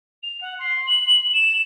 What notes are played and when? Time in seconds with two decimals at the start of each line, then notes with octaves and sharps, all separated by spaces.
0.23 F7
0.40 F#5
0.59 C6
0.86 F#7
1.33 E7